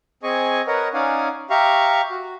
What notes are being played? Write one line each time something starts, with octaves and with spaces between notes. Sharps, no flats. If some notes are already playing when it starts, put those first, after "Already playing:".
C4 G#4 D#5 G#5 C#6
A#4 B4 C#5 D#5 F#5
C#4 D#4 D5 F5 F#5 G#5
G4 E5 F5 A#5 C#6
F#4